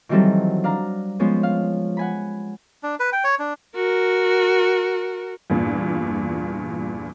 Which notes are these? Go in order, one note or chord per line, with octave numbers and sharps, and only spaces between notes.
D#3 E3 F#3 G3 C4 A4
D4 F5 A#5
F3 G#3 B3 C#4
F5
F#5 G#5 B5
D4
B4
G5
C#5
D4
F#4 A#4
E2 G2 A#2